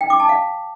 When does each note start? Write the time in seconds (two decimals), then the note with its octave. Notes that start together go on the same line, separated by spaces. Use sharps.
0.01 G5
0.10 D6
0.20 A5
0.29 F5